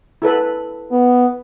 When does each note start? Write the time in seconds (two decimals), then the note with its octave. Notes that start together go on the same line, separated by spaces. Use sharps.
0.22 E4 A4 B4
0.92 B3